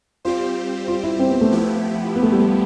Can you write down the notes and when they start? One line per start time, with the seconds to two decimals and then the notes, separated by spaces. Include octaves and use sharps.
0.25 G3 C4 F4 G4 C5
0.88 F4
1.04 E4
1.19 C4
1.30 B3
1.41 A3
1.52 F3 B3 E4 G4
2.15 B3
2.23 A3
2.32 G3
2.40 A3